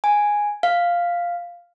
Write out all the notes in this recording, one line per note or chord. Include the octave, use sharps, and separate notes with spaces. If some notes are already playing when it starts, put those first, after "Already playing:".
G#5
F5